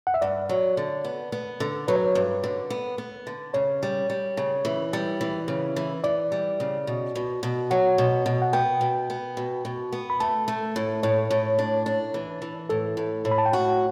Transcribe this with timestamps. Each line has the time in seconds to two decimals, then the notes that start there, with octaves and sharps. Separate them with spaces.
0.07 F#5
0.14 E5
0.22 G2 D5
0.49 F#3
0.77 D3
1.04 B3
1.32 B3
1.60 D3
1.88 F#3 B4
1.96 C#5
2.04 B4
2.15 G2
2.44 D3
2.70 B3
2.98 B3
3.27 D3
3.54 C#3 C#5
3.83 G3
4.10 G3
4.37 C#3
4.65 E3
4.93 G3
5.21 E3
5.48 C#3
5.76 E3
6.04 E3 D5
6.32 G3
6.60 C#3
6.87 B2
7.15 B2
7.43 B2
7.71 F#3 F#5
7.98 B2
8.26 B2
8.42 F#5
8.53 B3 G5
8.81 B2
9.10 B3
9.37 B2
9.65 B2
9.93 B3
10.10 B5
10.20 A3 A5
10.48 A3
10.76 A2
11.03 A2 C#5
11.31 A2
11.59 D4
11.86 D4
12.14 E3
12.42 E3
12.69 A2 A4
12.97 A2
13.25 A2
13.31 B5
13.38 A5
13.46 G5
13.53 F#4 F#5